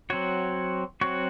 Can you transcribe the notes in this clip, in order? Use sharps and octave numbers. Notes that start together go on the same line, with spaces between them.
F#3 C4 F#4 C#5
F#3 C4 F#4 C#5